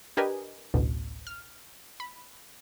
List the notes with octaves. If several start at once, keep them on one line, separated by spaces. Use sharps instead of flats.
D4 G4 A#4 B4 D#5 G#5
A1 D2 B2
F6
B5